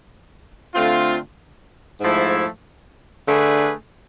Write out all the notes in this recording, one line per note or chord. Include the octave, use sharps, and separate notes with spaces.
D3 A3 C4 F4
G#2 F3 A3 E4
D3 A3 D4 G#4 B4